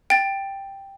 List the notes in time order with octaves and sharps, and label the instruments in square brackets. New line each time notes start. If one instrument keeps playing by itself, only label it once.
[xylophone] G5 A6